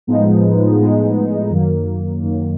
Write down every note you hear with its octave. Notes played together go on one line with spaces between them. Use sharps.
A2 F3 G#3 B3 D#4
A2 F3 G#3 B3 D#4
F#2 D#3 F#3 A#3
F#2 D#3 F#3 A#3